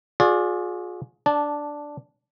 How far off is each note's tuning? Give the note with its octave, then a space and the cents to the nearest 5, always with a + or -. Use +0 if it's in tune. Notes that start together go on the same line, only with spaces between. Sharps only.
F4 +45 G#4 +15 D5 +0
D4 +0 A5 -15